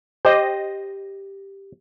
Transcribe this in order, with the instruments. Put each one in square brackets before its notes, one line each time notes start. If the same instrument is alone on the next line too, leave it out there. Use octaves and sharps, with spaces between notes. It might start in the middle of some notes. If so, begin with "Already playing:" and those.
[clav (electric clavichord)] G4 [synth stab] C5 D#5 A#6